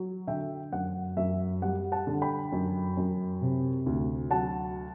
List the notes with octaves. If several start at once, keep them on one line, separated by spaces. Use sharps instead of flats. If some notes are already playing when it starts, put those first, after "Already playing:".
Already playing: F#3
D3 E5 G5
F#2 F#5
F#2 E5
G3 F#5
F#5 A5
D3
G5 B5
F#2
F#2
C3
D2
F#3 F#5 A5